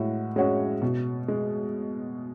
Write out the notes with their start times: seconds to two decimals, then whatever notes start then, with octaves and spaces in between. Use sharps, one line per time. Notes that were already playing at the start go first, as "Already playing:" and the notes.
Already playing: A2 G#3 F#4
0.36 G#3 C#4 F#4 C#5
0.82 B2
1.28 G#3